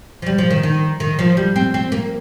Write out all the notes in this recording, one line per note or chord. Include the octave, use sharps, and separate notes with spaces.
F3
G3
F3
D#3
D#3
D#3
F3
G3
C4
C4
A#3